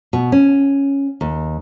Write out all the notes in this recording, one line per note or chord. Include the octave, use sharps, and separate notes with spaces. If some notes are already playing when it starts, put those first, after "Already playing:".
B2
C#4
D#2